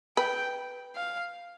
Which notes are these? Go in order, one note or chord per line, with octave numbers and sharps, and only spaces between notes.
B4 G5
F5